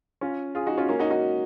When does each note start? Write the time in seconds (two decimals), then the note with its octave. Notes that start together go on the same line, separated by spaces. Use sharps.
0.21 C#4 F4
0.55 F4 G#4
0.66 D#4 F#4
0.77 C#4 F4
0.89 A#3 C#4
0.99 D#4 F#4
1.10 D#4 F#4